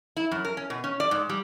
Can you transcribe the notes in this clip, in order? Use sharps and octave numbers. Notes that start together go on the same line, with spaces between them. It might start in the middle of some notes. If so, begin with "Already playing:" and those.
E4
F#2
A#4
C#4
B2
C#4
D5
G#2
G3